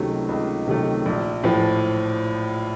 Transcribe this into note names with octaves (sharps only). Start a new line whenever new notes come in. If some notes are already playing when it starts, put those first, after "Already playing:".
Already playing: C#2 C3 D#3 F#3 A3
C#2
C3 D#3 F#3 A3
A#1
A2 F3